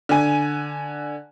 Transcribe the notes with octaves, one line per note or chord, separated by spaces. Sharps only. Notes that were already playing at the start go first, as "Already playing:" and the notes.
D3 G#5